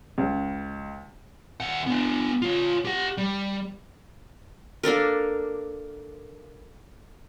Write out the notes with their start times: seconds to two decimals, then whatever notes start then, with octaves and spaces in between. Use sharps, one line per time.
0.18 C#2
1.60 D#2 F#5
1.86 B3 D4
2.42 F4 C#5
2.85 G4 F#5
3.18 G3
4.83 A#3 D4 A4 A#4